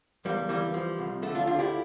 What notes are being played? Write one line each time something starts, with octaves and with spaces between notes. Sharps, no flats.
E2 G3 A#3
E3 G3 A#3
F3 G3
C2
D3 A3
D4 F4
D2 D4 F4
E4 G4